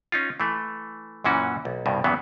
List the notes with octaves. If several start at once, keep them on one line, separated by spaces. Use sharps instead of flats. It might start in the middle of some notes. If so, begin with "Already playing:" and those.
C#4 D#4 F4
E3 A3
F#2 A#2 E3 C#4 F#4
B1
C2 G2 B2
E2 G2 C#3 E3 F#3 B3